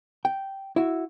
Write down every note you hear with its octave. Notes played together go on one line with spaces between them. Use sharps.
G5
E4 F#4